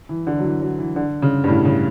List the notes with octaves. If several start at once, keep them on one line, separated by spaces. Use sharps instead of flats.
E3
D3
F#3
E3
F#3
E3
D3
C#3
G2
A2
C#3